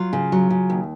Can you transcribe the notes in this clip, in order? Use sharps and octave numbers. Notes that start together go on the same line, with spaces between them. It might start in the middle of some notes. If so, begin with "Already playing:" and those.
Already playing: F#3 F4
C#3
F#3
C#3
D#2